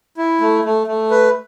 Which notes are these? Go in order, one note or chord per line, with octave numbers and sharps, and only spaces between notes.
E4
A3
A3
A3
B4